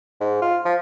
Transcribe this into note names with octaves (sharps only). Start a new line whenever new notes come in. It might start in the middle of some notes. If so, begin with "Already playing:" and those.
G#2
F4
F3